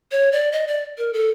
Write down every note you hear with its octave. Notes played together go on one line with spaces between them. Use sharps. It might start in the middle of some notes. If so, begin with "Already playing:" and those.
C#5
D5
D#5
D5
A#4
A4